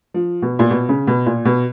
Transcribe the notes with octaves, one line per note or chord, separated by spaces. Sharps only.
F3
B2
A#2
B2
C#3
B2
A#2
B2